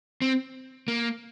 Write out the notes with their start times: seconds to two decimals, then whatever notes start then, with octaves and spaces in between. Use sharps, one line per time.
0.22 C4
0.88 A#3